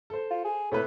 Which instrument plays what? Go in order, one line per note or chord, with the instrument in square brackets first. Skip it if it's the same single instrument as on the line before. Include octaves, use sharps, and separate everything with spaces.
[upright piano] A4 C5
[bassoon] F4
G#4
[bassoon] A2 [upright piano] C3 A3 B4